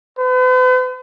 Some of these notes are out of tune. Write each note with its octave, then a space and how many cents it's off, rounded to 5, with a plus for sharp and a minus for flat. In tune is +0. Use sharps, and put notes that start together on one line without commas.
B4 +45